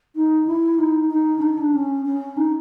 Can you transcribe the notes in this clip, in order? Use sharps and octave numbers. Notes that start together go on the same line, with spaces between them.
D#4
E4
D#4
D#4
D4
D#4
D4
C#4
C#4
D#4